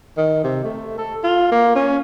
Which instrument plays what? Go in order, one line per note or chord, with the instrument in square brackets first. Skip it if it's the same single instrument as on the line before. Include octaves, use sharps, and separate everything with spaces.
[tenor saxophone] D#3
C3
A3
A4
F4
A#3
C#4